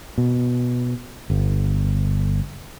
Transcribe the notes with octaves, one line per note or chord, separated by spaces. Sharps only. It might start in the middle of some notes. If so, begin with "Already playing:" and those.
B2
G1